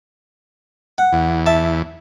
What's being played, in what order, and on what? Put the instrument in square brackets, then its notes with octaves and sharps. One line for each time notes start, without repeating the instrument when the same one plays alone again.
[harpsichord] F#5
[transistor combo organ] E2
[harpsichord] E5 A5